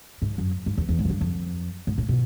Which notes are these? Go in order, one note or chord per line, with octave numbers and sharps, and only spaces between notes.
G#2
F#2
G#2
E2
E2
G#2
F#2
G2
F2
G#2
A2
B2